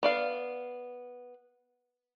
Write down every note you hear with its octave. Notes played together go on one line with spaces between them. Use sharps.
B3 D5 F5